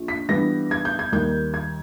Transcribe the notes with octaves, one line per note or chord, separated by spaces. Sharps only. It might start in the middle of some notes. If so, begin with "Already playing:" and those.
Already playing: A#1
B6
G2 E3 G3 B3 A#6
G#6
G6
G#6
D#2 D#3 G3 A#3 G6
G#6